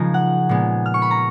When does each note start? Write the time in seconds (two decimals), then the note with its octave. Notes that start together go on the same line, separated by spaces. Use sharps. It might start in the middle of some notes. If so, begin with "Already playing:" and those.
Already playing: C#3 F3 G#3 A#3 D#4 G#5 A#5
0.14 F#5
0.49 A#2 G#3 B3
0.86 F6
0.94 C#6
1.02 B5
1.11 A#5